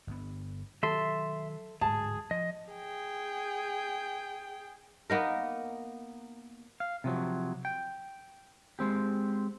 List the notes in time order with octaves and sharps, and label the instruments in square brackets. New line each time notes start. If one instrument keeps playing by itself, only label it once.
[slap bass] G1 B3
[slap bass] D#3 F#3 [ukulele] A4 [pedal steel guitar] E5 C6
[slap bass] D1 G#2 [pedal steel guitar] G#4 [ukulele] A5
[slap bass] F3 [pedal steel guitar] D#5
[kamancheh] G#4 G5
[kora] A#3 B3 D#4 A#4
[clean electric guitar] F5
C3 F3 F#3
G5
G#3 C4 G4